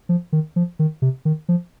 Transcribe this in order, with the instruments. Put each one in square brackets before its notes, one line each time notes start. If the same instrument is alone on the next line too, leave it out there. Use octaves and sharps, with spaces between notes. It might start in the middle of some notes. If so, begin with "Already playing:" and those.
[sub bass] F3
D#3
F3
D#3
C3
D#3
F3